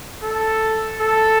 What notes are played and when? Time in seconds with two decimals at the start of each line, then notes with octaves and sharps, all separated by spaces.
0.23 A4
1.01 A4